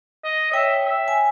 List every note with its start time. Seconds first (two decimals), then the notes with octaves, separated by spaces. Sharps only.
0.25 D#5
0.51 C#5 E5 G5
0.86 E5
1.08 G#5